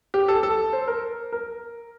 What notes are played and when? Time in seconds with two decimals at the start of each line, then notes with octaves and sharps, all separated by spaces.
0.14 G4
0.28 A4
0.43 A4
0.73 C5
0.88 A#4
1.32 A#4